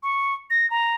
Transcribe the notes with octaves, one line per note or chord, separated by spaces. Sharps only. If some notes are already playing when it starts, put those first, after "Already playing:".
C#6
A#6
A#5